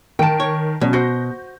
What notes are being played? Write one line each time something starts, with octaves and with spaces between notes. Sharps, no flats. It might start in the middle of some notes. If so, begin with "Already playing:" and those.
D#3 G5 A5 D7
C#5
B2 F#3 C#4
F#4 C5 G6 A#6